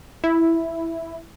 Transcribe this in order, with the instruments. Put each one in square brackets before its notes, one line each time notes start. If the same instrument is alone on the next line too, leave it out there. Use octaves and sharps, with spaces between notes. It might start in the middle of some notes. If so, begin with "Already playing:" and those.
[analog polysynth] E4